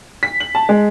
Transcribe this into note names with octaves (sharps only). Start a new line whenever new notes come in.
B6
F#7
A5
G#3